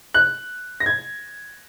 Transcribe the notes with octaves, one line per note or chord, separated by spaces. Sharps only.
F#6
A#6
G#6